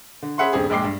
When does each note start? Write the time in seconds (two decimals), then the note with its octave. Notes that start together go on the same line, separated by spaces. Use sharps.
0.22 D3
0.38 C#4 G#4 E5 F#5 B5 C6
0.53 D#1 G2 C#3 C4 G4 G#4
0.70 A#1 G#3 G5 D6 C7
0.84 G2